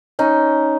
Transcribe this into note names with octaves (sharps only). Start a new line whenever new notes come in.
C#4 D#4